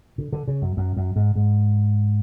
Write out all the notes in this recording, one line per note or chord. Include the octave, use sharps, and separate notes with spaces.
D3
D3
C#3
F#2
F#2
F#2
G#2
G#2